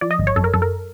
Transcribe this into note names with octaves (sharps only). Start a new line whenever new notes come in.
F3 D5
D#5
G#1
C#5
F#2 A4
A#4
F#2 A4
A#4